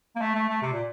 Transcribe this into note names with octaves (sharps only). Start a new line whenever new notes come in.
A#3
A3
A3
A3
C3
A#2